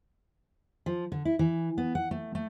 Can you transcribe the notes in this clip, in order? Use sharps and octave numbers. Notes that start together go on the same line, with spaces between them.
F3
D3
E4
E3
B3
F#5
A3
A3